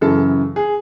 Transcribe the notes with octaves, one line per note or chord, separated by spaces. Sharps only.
F#2 C#3 E3 A4
G#4